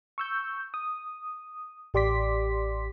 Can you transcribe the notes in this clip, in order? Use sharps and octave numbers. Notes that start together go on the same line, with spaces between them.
C#6 E6 G6
D#6
A1 G4 D5 C6 D6 B6